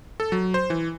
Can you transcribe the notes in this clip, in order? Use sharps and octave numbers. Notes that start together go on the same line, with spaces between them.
A4
F#3
C5
E3